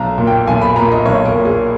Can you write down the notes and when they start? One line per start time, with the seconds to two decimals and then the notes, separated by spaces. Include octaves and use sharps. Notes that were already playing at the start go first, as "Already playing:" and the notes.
Already playing: B1 A#5
0.18 A#2
0.27 G5
0.47 B1 G#5
0.61 B5
0.76 A#2 A#5
0.92 D#5
1.05 B1 C#5
1.25 A#4
1.36 A#2
1.45 G#4